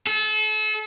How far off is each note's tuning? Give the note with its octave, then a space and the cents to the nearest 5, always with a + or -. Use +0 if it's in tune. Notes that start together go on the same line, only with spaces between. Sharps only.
A4 -35